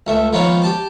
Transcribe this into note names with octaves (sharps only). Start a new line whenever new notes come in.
C#2 A3 E5
D#3 F3 G#3 A#3 B3 C#4
G4 A5 D6